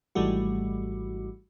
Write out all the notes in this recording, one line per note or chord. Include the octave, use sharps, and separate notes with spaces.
G#1 G#2 E3 G3 A3 F#4